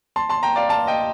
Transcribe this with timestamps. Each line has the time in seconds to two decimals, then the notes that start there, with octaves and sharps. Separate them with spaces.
0.16 A5 C6
0.29 A5 C6
0.43 G5 A#5
0.56 D5 F5
0.69 F5 A5
0.87 D#5 G5